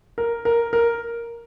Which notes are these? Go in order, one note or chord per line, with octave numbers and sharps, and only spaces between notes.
A#4
A#4
A#4